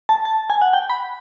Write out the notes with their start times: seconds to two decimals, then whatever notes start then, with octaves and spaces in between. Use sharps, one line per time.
0.09 A5
0.25 A5
0.50 G#5
0.62 F#5
0.73 G5
0.90 B5